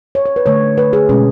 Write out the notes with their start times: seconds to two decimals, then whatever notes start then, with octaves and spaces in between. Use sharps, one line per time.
0.15 C#5
0.26 C#5
0.36 B4
0.46 D3 A3 C#5
0.78 B4
0.93 G#4
1.09 B2 G#3 C#4